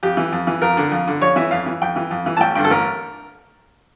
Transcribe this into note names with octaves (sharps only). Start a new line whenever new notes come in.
F2 G4
E3
F2
E3
F2 A#4
D3
F2
D3
F2 C#5
E3 E5
F2 F5
E3
F2 G5
E3
F2
E3
A5
A1 G5
G2 D3 G5
A4
A1 A#4